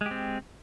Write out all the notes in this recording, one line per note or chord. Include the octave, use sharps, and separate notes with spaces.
G#3 C4 G4